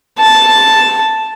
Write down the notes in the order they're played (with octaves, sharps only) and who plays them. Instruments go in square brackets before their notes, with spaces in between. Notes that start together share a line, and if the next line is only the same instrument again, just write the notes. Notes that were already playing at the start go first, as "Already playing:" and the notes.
[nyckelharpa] A5